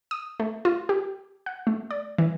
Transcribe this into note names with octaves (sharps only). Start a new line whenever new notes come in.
D#6
A3
F4
G4
F#5
A3
D5
E3